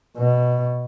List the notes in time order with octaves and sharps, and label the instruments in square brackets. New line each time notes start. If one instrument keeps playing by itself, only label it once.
[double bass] B2